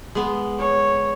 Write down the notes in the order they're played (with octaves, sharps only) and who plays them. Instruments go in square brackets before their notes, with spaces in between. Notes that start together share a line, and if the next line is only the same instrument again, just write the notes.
[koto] G#3 B3
[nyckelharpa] C#5